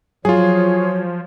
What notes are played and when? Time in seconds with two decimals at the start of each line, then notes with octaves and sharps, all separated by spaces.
0.25 F3 F#3 F4 G#4 C#5